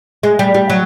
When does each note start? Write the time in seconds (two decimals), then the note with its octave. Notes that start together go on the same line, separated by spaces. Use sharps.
0.23 G#3
0.39 G3
0.54 G3
0.70 F#3